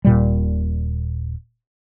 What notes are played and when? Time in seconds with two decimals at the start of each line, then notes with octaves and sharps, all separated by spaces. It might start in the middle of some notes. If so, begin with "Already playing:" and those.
0.05 D#1 A#2 G3